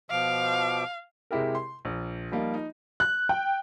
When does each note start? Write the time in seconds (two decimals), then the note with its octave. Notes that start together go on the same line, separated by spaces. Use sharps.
0.11 B2 F3 F5 D6
1.31 C3 G#3 E4 G4 A#4
1.55 C6
1.85 A#1
2.32 F3 G3 A#3 D#4 F4
2.54 D#4
3.00 F#6
3.29 G5